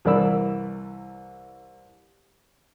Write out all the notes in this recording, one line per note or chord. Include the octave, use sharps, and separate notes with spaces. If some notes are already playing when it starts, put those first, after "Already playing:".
C2 E3 A#4 D5 B5 E6